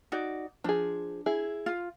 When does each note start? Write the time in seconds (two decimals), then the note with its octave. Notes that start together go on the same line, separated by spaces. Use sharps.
0.12 D#4 F#4 D5
0.64 F3 D4 G#4
1.26 E4 G#4
1.66 F4